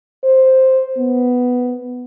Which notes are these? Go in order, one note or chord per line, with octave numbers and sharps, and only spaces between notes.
C5
B3